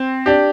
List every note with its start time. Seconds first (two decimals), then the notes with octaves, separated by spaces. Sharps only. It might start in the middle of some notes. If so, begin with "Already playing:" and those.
Already playing: C4
0.26 D4 G4